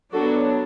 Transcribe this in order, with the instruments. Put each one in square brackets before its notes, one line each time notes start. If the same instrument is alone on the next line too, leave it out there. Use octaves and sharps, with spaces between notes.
[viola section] F#3 B3 D4 F#4 A4